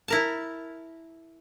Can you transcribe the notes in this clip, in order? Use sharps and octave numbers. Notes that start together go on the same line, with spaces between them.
E4 A#4 A5